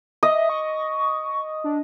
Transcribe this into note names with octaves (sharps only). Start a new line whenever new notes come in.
D#5 E5
C#6
D4